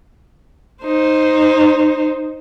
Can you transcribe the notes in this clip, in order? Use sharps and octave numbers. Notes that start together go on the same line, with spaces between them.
D#4 C5